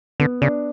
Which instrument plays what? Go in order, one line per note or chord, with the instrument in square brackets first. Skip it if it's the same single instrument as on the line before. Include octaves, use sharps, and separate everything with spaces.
[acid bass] D3 [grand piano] B3
[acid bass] C#3 [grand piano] D4